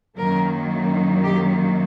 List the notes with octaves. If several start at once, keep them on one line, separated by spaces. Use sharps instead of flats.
F#2 D#3 F#3 A#3 A#4
G4